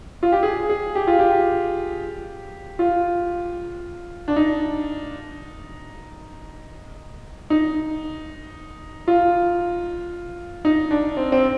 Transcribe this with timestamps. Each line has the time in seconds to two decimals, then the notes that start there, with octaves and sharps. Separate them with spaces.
0.23 F4
0.32 G4
0.43 G#4
0.70 G#4
0.95 G4
1.07 F4
1.19 G4
2.79 F4
4.28 D4
4.36 D#4
7.50 D#4
9.08 F4
10.65 D#4
10.91 D4
11.17 C4
11.32 C4